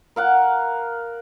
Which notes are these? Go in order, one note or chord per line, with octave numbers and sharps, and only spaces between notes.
A#4 F5 F#5